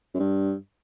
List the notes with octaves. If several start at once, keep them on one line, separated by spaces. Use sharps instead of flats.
F#2
G2